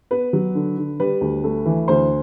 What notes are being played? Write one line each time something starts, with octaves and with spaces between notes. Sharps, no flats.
B3 B4
F#3
D3
D3
G3 B4
D2
A3
E3
D2 C5